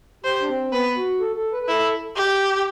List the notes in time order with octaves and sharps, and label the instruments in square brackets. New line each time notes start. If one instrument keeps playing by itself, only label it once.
[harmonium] G4 [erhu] C5
[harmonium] D4
C4
[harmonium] B3 [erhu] B4
[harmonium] F#4
A4
A4
B4
B4
[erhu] E4 [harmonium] A4
[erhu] G4